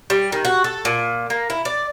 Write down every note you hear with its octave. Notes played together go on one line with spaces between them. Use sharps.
G3
D#3
F#4
A4
A#2
A#3
E4
D5